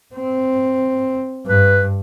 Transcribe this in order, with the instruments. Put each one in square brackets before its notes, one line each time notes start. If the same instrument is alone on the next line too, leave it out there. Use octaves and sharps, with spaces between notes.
[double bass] C4
[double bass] G2 [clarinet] B4